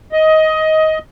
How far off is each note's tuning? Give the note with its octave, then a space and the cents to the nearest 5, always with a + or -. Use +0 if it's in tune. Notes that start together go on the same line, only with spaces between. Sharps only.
D#5 +15